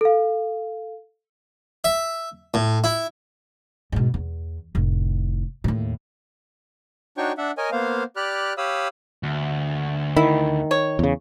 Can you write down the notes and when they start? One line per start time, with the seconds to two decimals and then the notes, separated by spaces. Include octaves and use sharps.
0.01 A4 F5
1.84 E5
2.54 A2
2.84 E4
3.92 G#2 B2
4.14 E2
4.75 F1 A2
5.64 D#2 A2
7.17 D4 D#4 F#4 C#5 G5 C#6
7.38 D4 E5 F#5
7.58 A#4 C#5 D#5 G#5
7.72 A#3 B3 C5 F5
8.16 G4 D5 B5 F6 F#6
8.58 G4 C#5 F5 B5 D#6 E6
9.23 D2
10.17 D#3 E4
10.71 C#5
10.99 E2 C#3